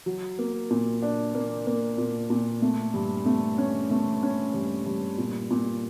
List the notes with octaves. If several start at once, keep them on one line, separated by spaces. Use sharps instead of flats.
F#3
A#3
A#2
D4
A#3
A#3
A#2
A#2
A3
G2
A3
C#4
A3
C#4
G2
G2
A#2
A#2